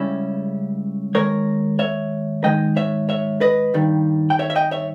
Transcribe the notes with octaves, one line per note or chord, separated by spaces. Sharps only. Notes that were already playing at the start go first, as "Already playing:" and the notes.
Already playing: C#2 C#3 G3 C#4 E4
D#2 C#3 G#3 A#4 C#5
C#5 E5
G#2 D#3 G#3 D#5 G5
C#5 E5
C#5 E5
B4 D#5
G2 D#3 G3
G5
C#5 E5
E5
D#5 G5
C#5 E5